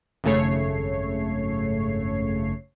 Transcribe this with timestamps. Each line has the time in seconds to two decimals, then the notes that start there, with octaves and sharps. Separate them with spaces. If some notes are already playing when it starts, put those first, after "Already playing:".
0.24 G#1 F#2 C#3 A3 C#5 C7